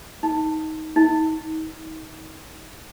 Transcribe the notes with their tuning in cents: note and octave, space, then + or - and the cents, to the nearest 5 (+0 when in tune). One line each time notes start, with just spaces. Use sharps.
D#4 +20
D#4 +30